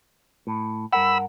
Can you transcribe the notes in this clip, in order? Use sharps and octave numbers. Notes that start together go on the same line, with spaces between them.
A2
G2 A#4 F#5 B5 E6